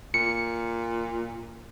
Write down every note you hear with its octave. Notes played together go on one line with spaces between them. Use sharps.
A#2 C#7